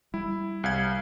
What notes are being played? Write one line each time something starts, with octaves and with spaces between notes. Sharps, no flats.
G3 E4
C2 F5 G#6